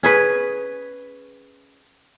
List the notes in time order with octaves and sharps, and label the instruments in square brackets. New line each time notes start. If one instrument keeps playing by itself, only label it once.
[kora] C#4 G#4 B4